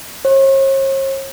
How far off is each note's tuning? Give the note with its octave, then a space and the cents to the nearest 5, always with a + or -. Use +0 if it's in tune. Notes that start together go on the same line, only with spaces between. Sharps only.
C#5 -45